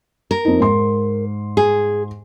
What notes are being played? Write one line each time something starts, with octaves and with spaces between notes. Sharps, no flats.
A#4
F2 D#4
G#2 C6
G#4